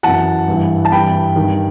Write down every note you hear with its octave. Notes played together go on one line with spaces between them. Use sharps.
F#2 E3 F#5 A5
G2 E3
A5
G2 E3 G5 B5
G2 D#3